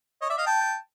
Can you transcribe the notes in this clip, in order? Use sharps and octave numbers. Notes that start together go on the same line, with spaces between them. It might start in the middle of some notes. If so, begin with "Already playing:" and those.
C#5 D#5
D5 E5
D#5 F5
G5 A5